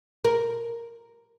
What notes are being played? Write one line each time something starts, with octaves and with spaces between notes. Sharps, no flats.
A#4